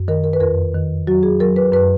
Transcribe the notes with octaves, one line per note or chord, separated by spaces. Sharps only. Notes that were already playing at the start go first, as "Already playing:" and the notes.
Already playing: F#2
D#3 A#4
A#4
B4
F2 A#4
D#3
F#3 F#4
G#4
F#3 A#4
B4
F#2 B4